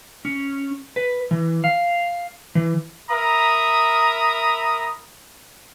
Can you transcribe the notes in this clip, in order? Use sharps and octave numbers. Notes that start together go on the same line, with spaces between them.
C#4
B4
E3
F5
E3
A#4 E5 A#5 B5 D#6